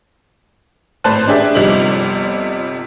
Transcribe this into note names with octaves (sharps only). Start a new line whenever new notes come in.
G#1 A2 B4 C5 A5 F#6
D4 G4 G#4 D5 E5
G1 C3 F3 G3 D#4 F#7